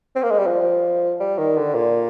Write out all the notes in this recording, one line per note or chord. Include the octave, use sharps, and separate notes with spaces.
C4
A#3
G#3
G3
F3
G3
D#3
D3
A#2